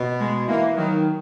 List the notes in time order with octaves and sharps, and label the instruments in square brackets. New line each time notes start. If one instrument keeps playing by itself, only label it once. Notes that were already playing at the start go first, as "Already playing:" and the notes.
Already playing: [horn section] B2
[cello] G#3
[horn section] E3 [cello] A#3
[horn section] D#3 [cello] F#3